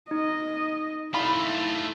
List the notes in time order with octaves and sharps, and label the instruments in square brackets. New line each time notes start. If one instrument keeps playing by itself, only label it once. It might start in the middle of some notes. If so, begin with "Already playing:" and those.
[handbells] D#4 [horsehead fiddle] D#5
[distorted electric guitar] A3 F4 [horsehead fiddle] E4 [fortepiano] B5